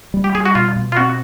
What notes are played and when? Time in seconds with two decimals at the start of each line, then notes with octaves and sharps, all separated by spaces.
0.14 G3
0.24 G4
0.35 G3 G#4
0.45 F#4
0.55 B2 F4
0.76 B2
0.92 F4
0.97 C4 F#4